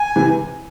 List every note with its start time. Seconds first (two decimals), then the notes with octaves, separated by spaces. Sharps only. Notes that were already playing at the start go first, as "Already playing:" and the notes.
Already playing: G#5
0.16 C3 E3